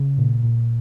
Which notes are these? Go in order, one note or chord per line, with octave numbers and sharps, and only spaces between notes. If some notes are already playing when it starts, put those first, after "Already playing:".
Already playing: C#3
A#2
A#2